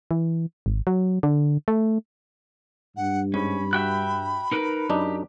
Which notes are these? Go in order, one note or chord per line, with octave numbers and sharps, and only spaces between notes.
E3
G#1
F#3
D3
A3
G2 F#5
G#2 C#4 B5
F#4 E5 G5 F#6
D#4 A#4 B4
F#2 D4 D#4 G4